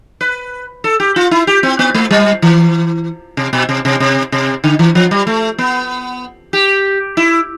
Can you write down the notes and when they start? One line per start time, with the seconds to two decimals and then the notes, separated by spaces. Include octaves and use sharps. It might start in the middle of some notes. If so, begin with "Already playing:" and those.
0.21 B4
0.84 A4
1.00 G4
1.16 F4
1.31 E4
1.47 G4
1.63 C4
1.79 B3
1.94 A3
2.11 G3
2.42 E3
3.37 C3
3.53 B2
3.69 C3
3.85 C3
4.00 C3
4.32 C3
4.64 D3
4.79 E3
4.95 F3
5.11 G3
5.27 A3
5.58 B3
6.53 G4
7.17 E4